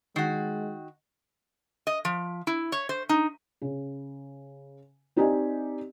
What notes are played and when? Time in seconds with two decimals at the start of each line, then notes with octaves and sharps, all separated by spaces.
0.16 D#3 G#3 F#4
1.87 D#5
2.05 F3
2.47 E4
2.72 C#5
2.89 C5
3.09 D#4
3.62 C#3
5.16 C4 D#4 G4 D5 D#5 G#5